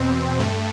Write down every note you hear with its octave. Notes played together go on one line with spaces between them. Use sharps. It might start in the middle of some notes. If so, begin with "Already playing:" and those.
Already playing: E2 B2 C4
G2 A3